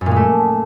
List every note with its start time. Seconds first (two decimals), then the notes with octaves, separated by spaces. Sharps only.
0.01 F#2
0.06 A#2
0.11 G#3
0.16 A3